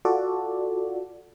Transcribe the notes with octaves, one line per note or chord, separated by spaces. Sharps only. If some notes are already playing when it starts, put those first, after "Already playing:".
F4 F#4 A4 D5